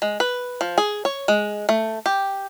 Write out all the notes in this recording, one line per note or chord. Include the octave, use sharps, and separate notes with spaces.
G#3
B4
F3
G#4
C#5
G#3
A3
G4